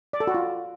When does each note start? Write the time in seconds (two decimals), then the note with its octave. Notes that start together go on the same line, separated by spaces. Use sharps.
0.13 D5
0.20 A4
0.27 F#4
0.34 F4